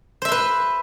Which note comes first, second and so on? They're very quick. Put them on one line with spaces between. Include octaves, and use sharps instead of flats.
C5 E5 C6 B4